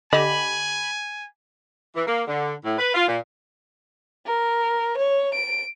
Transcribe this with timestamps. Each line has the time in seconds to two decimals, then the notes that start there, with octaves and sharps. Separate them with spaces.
0.13 D3 G4 D#5 G#5 B5
1.95 E3
2.07 A#3
2.27 D3
2.65 A2
2.78 B4
2.94 F4
3.08 A#2
4.26 A#4
4.98 C#5
5.35 D7